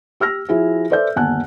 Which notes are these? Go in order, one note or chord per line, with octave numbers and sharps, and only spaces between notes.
G4 E6 F6 A#6
F3 E4 F#4 G#4 E5
A4 B4 C5 D5 E5 G6
G1 D#2 F#5 G#5 A5 F#6